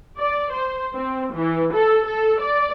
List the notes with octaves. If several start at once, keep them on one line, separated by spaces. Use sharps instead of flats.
D5
C5
C4
E3
A4
A4
D5